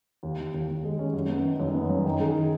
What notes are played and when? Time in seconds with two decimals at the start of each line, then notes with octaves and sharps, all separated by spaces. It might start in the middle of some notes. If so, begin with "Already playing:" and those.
0.23 D#2
0.38 D#2
0.54 D#2
0.69 D#2
0.84 G#3
0.99 C#4
1.14 F#2
1.30 B3
1.44 D#3
1.60 F#2
1.75 B3
1.90 F#2
2.05 D#3
2.20 G#4
2.35 D#3